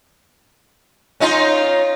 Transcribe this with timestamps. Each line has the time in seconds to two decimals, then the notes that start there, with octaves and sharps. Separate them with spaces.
1.20 C#4 D#4 F4